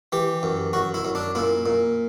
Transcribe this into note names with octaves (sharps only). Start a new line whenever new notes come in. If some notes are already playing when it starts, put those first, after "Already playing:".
E3 G4
F#2
F#2 F#4
E4
F#2
D4
A#2 E4
A#2